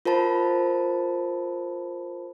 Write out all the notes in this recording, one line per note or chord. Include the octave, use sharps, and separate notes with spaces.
F4 A#4 C5 A5 B5